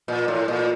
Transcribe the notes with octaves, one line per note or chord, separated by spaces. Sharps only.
A#2
A2
A#2